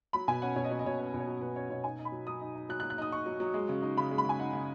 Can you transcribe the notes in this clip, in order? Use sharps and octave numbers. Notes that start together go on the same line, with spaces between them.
F#3 B5
B2 G#5
C#4 F#5
B2 C#5
D#5
F#3 C#5
D#5
B2 C#5
C#4 B4
B2
C#5
F#3
B2 B4
C#4 C#5
B2 C#5
D#4 G#5
D#4
B5
F#3
F#3 D#6
D#4
D#4
F#3 F#6
F#6
F#3
F#6
D#4 D#6
D#4 C#6
F#3
F#3
G#3
C#3
D#4
C#3 B5
G#3
B5
C#3 G#5
D#4 F#5
C#3